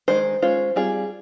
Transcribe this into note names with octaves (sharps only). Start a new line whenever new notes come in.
D#3 G#3 D#4 C5
G#3 C#4 F4 C5
G3 C4 F4 G#4